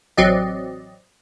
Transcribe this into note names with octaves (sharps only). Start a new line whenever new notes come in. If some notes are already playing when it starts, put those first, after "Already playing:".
A1 F#3 C4 D5 D#5